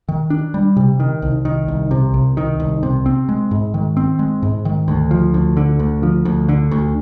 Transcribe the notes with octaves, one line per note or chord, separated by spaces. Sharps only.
D#3
D4
G3
C3
D#3
C2
D#3
C2
C3
C2
D#3
C2
C3
C4
G#3
G#2
D#3
C4
G#3
G#2
D#3
D2
F3
D2
D3
D2
F3
D2
D3
D2